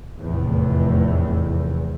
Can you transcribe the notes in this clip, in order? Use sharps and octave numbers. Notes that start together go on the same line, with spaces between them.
F1 E2 A2